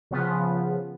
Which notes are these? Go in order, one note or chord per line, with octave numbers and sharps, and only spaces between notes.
C#3 F3 B3